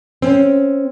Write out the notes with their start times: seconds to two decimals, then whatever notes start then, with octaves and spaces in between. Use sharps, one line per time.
0.22 C4 C#4